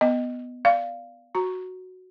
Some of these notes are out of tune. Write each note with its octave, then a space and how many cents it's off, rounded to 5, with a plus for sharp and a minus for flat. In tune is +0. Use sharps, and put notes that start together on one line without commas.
B3 +5 D#5 +0
D5 +0 F5 -5
F#4 +0 A#5 +0